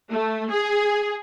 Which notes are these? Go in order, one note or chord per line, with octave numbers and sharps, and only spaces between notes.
A3
G#4